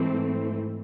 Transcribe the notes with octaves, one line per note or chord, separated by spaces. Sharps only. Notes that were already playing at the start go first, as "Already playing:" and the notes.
Already playing: G#2 E3 A3 C4